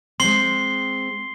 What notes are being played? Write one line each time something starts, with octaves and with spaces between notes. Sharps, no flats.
G#3 C4 C6 C7 G7